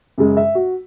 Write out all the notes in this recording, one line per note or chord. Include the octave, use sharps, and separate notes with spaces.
F#2 C#3 G#3
E5
F#4